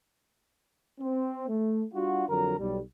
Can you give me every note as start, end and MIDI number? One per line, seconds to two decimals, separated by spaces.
1.01 1.48 60
1.49 1.84 57
1.94 2.25 55
1.94 2.25 62
1.94 2.25 65
1.94 2.25 66
2.29 2.55 41
2.29 2.55 50
2.29 2.55 54
2.29 2.55 70
2.29 2.55 82
2.59 2.80 35
2.59 2.80 55